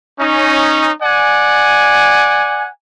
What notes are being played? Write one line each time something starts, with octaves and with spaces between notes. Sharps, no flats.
C#4 D#4
D5 F#5 G#5